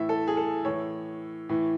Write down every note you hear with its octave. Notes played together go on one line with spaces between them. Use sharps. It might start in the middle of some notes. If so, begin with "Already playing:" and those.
Already playing: A2 E3 E5
A4
G#4
A4
A2 E3 C#5
A2 E3